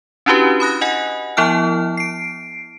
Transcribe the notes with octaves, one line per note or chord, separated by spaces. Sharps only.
C#4 D4 E4 F#4 G4 B4
B5 D#6 F#6 A#6
D#5 F#5 G#5
F3 B3 E4 A5 F6
C7 D7